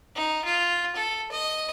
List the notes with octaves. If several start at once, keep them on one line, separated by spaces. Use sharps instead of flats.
D#4
F4
A4
D#5